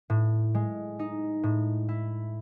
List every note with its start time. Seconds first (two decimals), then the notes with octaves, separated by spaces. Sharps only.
0.10 A2
0.55 G#3
0.99 D#4
1.43 A2
1.89 E4